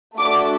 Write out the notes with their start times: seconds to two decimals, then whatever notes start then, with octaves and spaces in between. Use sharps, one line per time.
0.18 A3 D4 F#4 A4 D6